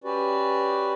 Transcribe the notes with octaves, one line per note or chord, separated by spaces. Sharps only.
C#4 F#4 G4 B4 D5